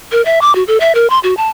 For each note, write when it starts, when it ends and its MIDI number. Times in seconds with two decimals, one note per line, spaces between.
0.12 0.23 70
0.25 0.39 76
0.42 0.55 86
0.55 0.63 66
0.68 0.78 69
0.80 0.92 76
0.95 1.09 70
1.10 1.19 84
1.23 1.36 66
1.37 1.50 81